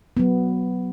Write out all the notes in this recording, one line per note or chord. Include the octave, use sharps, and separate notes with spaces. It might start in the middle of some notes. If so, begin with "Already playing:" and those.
F#3 B3